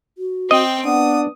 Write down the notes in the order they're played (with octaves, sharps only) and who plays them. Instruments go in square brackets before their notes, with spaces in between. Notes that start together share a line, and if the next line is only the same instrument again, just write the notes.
[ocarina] F#4
[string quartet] C4 G5 [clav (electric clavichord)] D#5
[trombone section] B3 D4 [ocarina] F#5 [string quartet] D#6